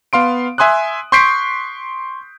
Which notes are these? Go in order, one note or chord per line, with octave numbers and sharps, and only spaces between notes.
B3 F5 C6 D7
E5 G#5 C6 D#6 F#6
C6 C#6 G6 B6 C7 D7